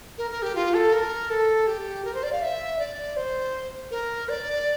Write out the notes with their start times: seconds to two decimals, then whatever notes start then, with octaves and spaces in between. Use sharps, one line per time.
0.18 A#4
0.31 A#4
0.42 G4
0.55 F4
0.74 A4
0.93 A#4
1.30 A4
1.67 G4
2.05 A#4
2.14 C5
2.23 D5
2.33 F5
2.42 E5
2.79 D5
3.17 C5
3.91 A#4
4.29 D5